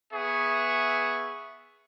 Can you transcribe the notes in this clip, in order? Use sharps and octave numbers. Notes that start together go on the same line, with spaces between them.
B3 G#4 E5 C#6